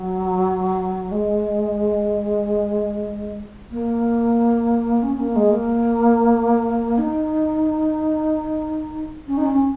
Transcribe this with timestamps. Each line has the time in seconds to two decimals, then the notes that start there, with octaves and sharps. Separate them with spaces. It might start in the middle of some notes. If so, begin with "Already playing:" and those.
Already playing: F#3
1.11 G#3
3.71 A#3
5.02 C#4
5.19 A#3
5.35 G#3
5.51 A#3
6.98 D#4
9.27 C#4
9.37 D#4
9.45 C#4